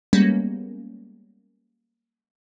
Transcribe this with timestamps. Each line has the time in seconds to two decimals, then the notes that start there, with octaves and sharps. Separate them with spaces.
0.13 G3 G#3 A#3 B3 C#4